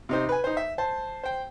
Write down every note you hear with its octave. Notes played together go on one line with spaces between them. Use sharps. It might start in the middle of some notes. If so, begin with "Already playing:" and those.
C3 D#4 C5
B4 G#5
D#4 C5
E5
C5 A5
C5 G5